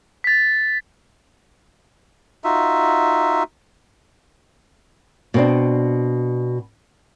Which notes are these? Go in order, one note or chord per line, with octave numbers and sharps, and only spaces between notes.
A6 B6
D#4 F4 F#4 E5
B2 C4 D4